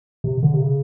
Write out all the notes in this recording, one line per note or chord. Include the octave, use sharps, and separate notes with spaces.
C3
D3
C3
C#3